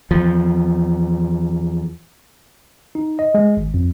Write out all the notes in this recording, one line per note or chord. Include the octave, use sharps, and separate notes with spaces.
E2 F3
D#4
D#5
G#3
G#1
F2